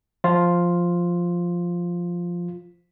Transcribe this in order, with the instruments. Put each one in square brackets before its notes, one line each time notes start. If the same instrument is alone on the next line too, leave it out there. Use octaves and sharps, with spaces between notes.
[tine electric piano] F3 F4